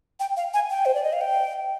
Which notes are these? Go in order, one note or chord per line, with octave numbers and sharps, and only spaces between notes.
G5
F5
G#5
G5
C5
D5
D#5
F5
G5